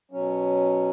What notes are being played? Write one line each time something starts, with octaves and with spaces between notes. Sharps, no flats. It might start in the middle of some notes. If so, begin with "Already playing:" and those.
B2 F#3 C#4